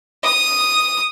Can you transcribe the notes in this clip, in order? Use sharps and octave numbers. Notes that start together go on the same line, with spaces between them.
D#6